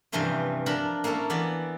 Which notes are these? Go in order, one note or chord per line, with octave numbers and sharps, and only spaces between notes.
G2 C3 E3 F3 C4 C#4
F3 D4 A#4 A#5 B5
A#3 C#4 E4 A4 A#4
E3 B3 E4 D5